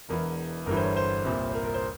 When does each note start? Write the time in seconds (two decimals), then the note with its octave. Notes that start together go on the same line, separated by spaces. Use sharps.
0.09 E1 E2 E3 A#4
0.66 G1 G2 E3 A#4
0.77 C5
0.81 C#5
0.96 C5
1.25 C2 A#2
1.50 C5
1.54 A#4
1.64 A#4
1.74 C5